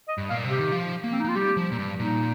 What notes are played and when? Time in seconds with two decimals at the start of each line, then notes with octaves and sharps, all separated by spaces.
0.08 D#5
0.18 G2
0.30 A#2 F5
0.44 C3
0.50 G4
0.59 D#3
0.72 F3
1.04 A#3
1.12 C4
1.20 D#4
1.24 A#3 F4
1.35 G3 G4
1.57 F3
1.72 A#2
1.79 G2
1.99 A#2 D#4